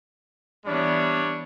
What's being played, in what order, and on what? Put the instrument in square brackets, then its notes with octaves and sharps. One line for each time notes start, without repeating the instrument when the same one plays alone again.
[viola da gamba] E3 B3 [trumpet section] G3 D4 C#5